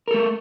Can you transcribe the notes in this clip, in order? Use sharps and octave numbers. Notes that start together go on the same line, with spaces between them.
A3 A4 A#4